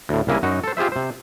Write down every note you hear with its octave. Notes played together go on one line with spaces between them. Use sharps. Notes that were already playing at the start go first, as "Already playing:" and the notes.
D2 A2
C2 C#3 A#3 E4 G#5
F#2 D#4 F#4
A4 C5
F4 G4 G#4 C5 E5
C3 C5